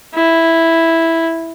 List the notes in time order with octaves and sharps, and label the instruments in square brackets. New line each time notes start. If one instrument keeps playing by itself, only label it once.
[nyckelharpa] E4